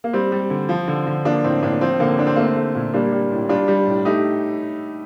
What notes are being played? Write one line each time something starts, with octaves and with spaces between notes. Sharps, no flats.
A#3
G3 C4
G3
D3
F3
D3
D3
F3 A#3 D4
A2 C4
A2 A#3 D4
F3 C4
D3 A#3
D3 D4
C4
A3 A#3
C4
A3
A#2
G3 A#3 D4
G3
A2
G3 D4 F4
G3
A2
A3 D#4 G4